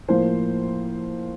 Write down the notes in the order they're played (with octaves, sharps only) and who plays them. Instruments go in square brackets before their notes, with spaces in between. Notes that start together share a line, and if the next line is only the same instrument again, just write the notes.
[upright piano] A2 F3 A#3 C5